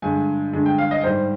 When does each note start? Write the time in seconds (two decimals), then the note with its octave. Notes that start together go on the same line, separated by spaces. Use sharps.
0.02 G2 D3 G#3 G#5
0.53 G2 D3 G#3
0.66 G5
0.78 F5
0.91 D#5
1.03 G#2 G3 C5